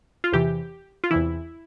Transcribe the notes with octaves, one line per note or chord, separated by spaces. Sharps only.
F4
E2 C3 E3 G4
F4
E2 C3 E3 E4